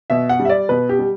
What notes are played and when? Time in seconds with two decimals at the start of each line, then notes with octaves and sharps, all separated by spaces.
0.10 B2 E5
0.29 F#5
0.39 G3
0.45 E5
0.49 D5
0.69 B2 B4
0.89 G4
0.99 G3